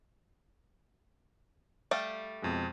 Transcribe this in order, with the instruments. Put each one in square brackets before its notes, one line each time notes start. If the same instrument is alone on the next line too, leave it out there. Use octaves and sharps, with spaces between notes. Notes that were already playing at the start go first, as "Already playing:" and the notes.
[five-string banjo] G3 A3 F5
[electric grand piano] F2 B2 G#3